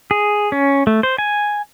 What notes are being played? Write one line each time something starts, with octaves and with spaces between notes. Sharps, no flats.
G#4
C#4
A3
C5
G#5